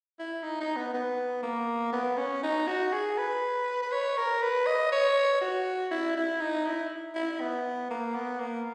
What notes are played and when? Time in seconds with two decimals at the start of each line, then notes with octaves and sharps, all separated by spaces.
0.19 E4
0.43 D#4
0.61 D#4
0.76 B3
0.94 B3
1.43 A#3
1.93 B3
2.17 C#4
2.43 D#4
2.67 F#4
2.93 G#4
3.18 B4
3.82 B4
3.92 C#5
4.17 A#4
4.42 B4
4.66 D#5
4.92 C#5
5.41 F#4
5.91 E4
6.17 E4
6.41 D#4
6.66 E4
7.15 E4
7.41 B3
7.90 A#3
8.16 B3
8.40 A#3